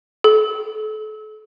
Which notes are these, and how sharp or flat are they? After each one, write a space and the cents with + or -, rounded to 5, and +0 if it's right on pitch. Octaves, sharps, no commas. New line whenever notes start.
A4 -35